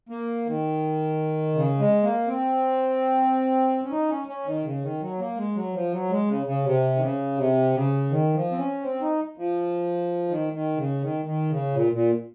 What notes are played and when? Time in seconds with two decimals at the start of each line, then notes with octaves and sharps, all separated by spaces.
0.09 A#3
0.46 D#3
1.55 C#3
1.79 G#3
2.03 A#3
2.28 C4
3.84 C#4
3.91 D#4
4.10 C#4
4.28 C#4
4.46 D#3
4.64 C#3
4.82 D#3
5.01 F#3
5.19 A#3
5.37 G#3
5.56 F#3
5.73 F3
5.92 F#3
6.10 G#3
6.28 C#3
6.46 C#3
6.65 C3
6.96 D#3
7.01 C#3
7.37 C3
7.74 C#3
8.10 D#3
8.34 F3
8.51 C4
8.58 C#4
8.83 C4
9.01 D#4
9.37 F3
10.28 D#3
10.53 D#3
10.77 C#3
11.01 D#3
11.25 D#3
11.50 C#3
11.74 A#2
11.92 A#2